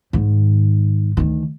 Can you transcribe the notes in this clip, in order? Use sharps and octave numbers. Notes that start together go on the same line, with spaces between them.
G#2 D#3
D2 D#3